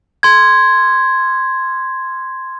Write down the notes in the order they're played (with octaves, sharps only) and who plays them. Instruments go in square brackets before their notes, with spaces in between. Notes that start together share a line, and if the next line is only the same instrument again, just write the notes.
[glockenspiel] C6 G#6